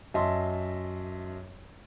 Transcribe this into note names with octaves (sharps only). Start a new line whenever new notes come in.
F#2 D#5 E5 A5 C6